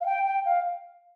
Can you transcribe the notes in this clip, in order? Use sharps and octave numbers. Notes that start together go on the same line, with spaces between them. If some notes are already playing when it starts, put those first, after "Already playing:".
F5
G5
G5
F5